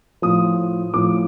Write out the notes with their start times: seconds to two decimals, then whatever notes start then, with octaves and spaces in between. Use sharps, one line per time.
0.22 A2 F3 D#6
0.94 A2 F3 D6